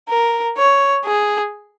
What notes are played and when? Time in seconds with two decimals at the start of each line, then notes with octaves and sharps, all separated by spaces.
0.10 A#4
0.58 C#5
1.05 G#4